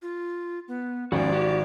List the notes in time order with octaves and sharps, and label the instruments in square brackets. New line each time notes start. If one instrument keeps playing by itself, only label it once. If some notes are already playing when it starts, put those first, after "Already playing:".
[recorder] F4
B3
[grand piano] G#1 [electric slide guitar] F3 C#4 F#4 [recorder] D5
[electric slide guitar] F#4 G4